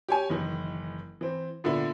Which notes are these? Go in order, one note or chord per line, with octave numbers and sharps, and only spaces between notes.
G4 C#5 G#5
F#1 D#3 E3
E3 C4
A#2 D3 B3 E4